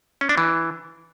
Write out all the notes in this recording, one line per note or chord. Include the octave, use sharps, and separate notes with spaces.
C#4
D4
E3